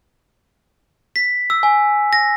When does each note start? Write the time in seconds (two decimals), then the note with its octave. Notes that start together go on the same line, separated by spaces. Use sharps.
1.16 B6
1.50 E6
1.63 G#5
2.13 A#6